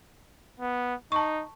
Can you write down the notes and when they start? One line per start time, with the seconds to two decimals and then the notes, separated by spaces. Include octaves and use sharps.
0.60 B3
1.12 D#4 A5 C#6